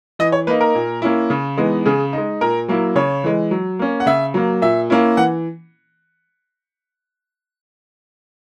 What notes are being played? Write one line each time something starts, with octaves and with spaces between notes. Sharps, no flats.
E3 D#5
C#5
A#3 D#4 B4
A#4
A#2
A#3 C#4 E4
C#3
E3 G#3 B3 D#4
C#3 G#4
G#3 D#4
A#2 A#4
F#3 A#3 E4
C#3 C#5
E3 G#3
F#3
A#3 C#4
F#5
C#3 E5
F#3 A#3
A#2 E5
A#3 C#4 E4
E3 F#5